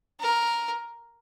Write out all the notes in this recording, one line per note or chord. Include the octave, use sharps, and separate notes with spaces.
A#4